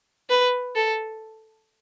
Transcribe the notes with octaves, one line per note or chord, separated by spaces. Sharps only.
B4
A4